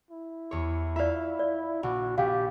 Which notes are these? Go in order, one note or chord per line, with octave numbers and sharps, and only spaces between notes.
E4
E2 G4 C#5
F4 D5 E5 F5
D5
A#1 F#4
A#1 G4 F5